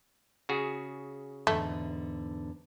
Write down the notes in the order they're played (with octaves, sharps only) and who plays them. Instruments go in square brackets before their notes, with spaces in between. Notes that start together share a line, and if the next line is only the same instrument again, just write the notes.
[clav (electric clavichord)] C#3 F#4 G#4
[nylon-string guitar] E2 G#2 D3 [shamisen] A3